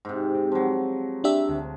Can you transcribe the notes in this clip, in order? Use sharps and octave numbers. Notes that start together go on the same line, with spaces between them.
G#2 C3
C4
F3 F#3
D4 G4 E5
D2